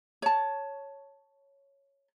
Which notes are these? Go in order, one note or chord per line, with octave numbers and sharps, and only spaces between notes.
C#5 A5